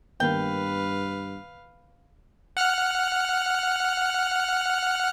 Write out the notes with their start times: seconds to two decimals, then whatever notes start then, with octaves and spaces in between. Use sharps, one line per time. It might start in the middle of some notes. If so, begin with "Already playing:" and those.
0.20 G2 D#3 A#3 B3 B4 F5 G5
2.57 F#5 F6 F#6